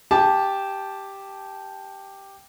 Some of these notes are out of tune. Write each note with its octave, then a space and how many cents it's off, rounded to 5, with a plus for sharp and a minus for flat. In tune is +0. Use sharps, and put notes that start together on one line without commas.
G4 +0 A5 -15